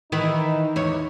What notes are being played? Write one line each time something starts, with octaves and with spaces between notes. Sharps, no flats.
D#3 E3 D#4 B4
E2 C#5